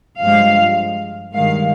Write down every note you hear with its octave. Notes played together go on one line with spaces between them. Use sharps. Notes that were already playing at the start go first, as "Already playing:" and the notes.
G2 F3 G#3 F5
G2 D#3 G#3 F5